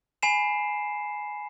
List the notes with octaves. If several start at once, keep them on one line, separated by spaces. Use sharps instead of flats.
G#5 B5 C7 E7